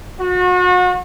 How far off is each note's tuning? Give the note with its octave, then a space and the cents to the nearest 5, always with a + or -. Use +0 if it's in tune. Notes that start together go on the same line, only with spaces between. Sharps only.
F#4 -35